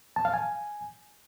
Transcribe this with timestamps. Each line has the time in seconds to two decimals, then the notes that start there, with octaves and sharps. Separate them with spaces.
0.16 A5
0.25 F5
0.34 G#5